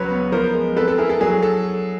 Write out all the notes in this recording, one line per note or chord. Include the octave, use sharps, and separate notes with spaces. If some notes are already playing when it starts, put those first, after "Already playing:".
Already playing: C#2 F#3 B4 C#5
B3
F3 A#4 C5
G#3
C4 A4 B4
A4
E4 G#4 A#4
A4
F#3 G#4
A4